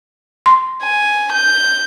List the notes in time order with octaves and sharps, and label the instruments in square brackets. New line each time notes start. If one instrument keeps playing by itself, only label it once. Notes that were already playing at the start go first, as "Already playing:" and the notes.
[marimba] C6
[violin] G#5
G6